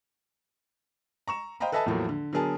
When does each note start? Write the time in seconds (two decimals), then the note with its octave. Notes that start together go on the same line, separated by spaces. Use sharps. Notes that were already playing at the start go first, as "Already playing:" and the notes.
1.28 A#5 C#6 E7
1.60 C5 D#5 F5 G5 A#5 B5
1.72 A4 B4 D#5 E5 G#5 A5
1.86 E2 A2 F3 F#3 A3 A#3
2.09 D3
2.33 D3 F#3 B3 G#4 A#4 A5